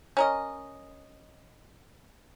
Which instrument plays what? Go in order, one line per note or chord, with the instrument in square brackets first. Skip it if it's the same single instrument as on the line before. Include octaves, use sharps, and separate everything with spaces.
[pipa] C#4 A#4 D#5